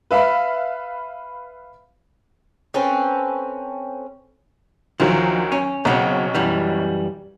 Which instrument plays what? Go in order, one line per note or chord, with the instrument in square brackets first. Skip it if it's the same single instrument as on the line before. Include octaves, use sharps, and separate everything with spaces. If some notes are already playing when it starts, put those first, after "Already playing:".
[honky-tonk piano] B4 E5 F5 B5
[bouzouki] C4 C#4 A4 B4
[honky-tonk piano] D2 D#3 F#3 [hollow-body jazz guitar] F3
[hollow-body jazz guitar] C#4
[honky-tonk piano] B1 C#4 [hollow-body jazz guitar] C#3 F#3 C4
[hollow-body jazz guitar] F#2 E3 G3